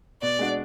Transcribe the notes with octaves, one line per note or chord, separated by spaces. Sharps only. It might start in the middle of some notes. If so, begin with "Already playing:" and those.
B2 D5
G#3 D4 F#4